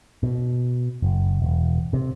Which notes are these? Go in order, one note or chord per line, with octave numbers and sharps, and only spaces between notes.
B2
F#1
E1
C3